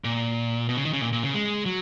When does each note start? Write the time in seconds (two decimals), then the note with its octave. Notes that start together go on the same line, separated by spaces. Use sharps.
0.04 A#2
0.69 B2
0.77 C#3
0.85 D#3
0.93 C#3
1.01 A#2
1.12 A#2
1.23 C#3
1.34 G#3
1.66 F#3